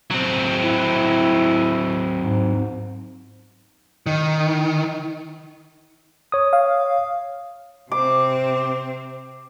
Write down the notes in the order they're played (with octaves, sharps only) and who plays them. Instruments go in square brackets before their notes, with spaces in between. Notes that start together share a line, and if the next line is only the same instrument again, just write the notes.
[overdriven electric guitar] F#3 C4
[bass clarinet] E4
G#2
[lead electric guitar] D#3
[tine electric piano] C#5 D#6
[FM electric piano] F5
[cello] C3 C4 [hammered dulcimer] D6